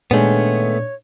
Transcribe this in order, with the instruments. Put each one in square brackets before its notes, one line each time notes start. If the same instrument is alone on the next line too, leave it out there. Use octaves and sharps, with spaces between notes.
[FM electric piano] A#2 D4 [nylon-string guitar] D#3 G#3 [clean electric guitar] A3 B3 [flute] C#5